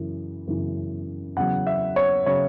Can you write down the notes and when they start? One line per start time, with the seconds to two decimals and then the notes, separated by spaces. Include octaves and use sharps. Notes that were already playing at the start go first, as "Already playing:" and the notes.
Already playing: F#2 C#3 E3
0.47 F#2 C#3 E3
1.36 E2 C#3 F#3 F#5
1.67 E5
1.96 C#5
2.26 C#3 F#3 C#5